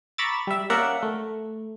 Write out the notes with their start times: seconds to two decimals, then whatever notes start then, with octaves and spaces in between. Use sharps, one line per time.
0.18 A#5 B5 C#6 D6 E6 A6
0.47 G3 E5
0.70 A#3 C#4 A#4 D5 E5 F#5
1.03 A3